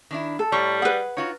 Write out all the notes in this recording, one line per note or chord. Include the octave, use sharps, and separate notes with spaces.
D#3 D4 E4
A4
A2 G3 C#5 A#5
G#4 B4 F#5
D#4 F4 F#4 C#5